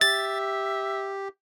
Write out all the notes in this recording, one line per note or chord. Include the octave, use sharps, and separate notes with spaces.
G4 E5 A6